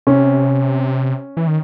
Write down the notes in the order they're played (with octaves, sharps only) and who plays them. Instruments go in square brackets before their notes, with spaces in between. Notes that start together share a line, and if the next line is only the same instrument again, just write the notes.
[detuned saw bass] C3 [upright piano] C#4
[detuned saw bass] E3
D#3